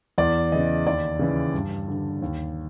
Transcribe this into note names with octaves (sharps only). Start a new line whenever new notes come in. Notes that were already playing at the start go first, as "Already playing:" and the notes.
E2 D5
C#3 E3 D#5
D#2 D5
C#3 E3
G2
D3
D#2